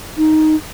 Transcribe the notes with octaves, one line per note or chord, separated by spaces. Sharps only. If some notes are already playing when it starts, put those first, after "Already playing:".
D#4